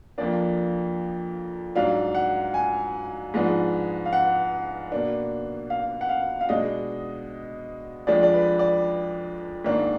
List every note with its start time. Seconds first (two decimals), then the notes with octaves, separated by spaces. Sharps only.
0.18 F2 F3 A#3 D4 D5
1.75 G#2 F#3 D4 F5
2.15 F#5
2.54 G#5
3.34 G#2 F3 G#3 B3 D4
4.06 F5
4.13 F#5
4.92 B2 A#3 D4
5.70 F5
6.01 F#5
6.09 F5
6.41 F5
6.49 B2 G#3 D4 D#5
8.07 F2 F3 G#3 D4 D5
8.23 D5
8.33 B4
8.59 D5
9.64 G#2 D#3 A#3 D4